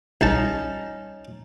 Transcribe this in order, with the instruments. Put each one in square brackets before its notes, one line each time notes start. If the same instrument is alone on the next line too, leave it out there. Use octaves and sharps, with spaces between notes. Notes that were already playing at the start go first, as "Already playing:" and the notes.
[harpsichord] C2 A5 [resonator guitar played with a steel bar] C#4 D#4